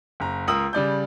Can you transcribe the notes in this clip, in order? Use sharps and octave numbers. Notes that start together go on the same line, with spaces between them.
F#1 A#5
C#2 A#4 D#6 E6 F#7
C#3 G3 D5 G6